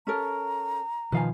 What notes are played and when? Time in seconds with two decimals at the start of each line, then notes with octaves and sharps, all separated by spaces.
0.07 C#4 A4 A#4 A#5
1.12 B2 D#3 F3 B4 F5 G#5